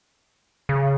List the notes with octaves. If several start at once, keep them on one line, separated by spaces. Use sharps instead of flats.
C#3